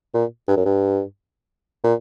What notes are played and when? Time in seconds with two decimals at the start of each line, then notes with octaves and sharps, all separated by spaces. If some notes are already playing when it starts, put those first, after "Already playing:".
0.14 A#2
0.48 G2
0.57 F#2
0.65 G2
1.84 A#2